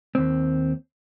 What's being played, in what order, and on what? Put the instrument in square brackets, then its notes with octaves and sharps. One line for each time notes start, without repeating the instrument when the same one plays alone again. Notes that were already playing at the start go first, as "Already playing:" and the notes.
[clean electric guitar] D#2 C4